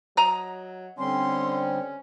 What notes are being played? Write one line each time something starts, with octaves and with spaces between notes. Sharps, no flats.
F#3 D#5 A#5
D3 G3 C4 C#4 C6